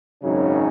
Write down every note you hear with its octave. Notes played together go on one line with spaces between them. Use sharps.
G#1 F#2 C#3 F#3 C#4 D#4